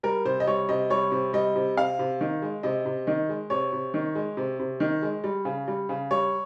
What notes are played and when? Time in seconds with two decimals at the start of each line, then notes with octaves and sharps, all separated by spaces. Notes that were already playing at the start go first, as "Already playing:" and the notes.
0.03 G3 A#4
0.25 C3 C5
0.40 D#5
0.47 G3 C#5
0.69 C3 D#5
0.90 G3 C#5
1.12 C3
1.33 G3 D#5
1.56 C3
1.77 C3 F5
1.99 C3
2.21 D#3
2.42 G#3
2.63 C3 D#5
2.86 C3
3.07 D#3 D#5
3.29 G#3
3.50 C3 C#5
3.73 C3
3.94 D#3
4.15 G#3
4.37 C3
4.59 C3
4.80 D#3
5.02 G#3
5.24 G3
5.45 C#3
5.68 G3
5.89 C#3
6.11 G3 C#5